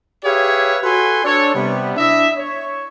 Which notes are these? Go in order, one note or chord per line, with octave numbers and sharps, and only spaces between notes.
G4 G#4 B4 C#5 E5 F5
F#4 A4 B4 G#5 C6
D4 A4 C#5
C3 G3 B3
D4 E4 D#5 E5
C#5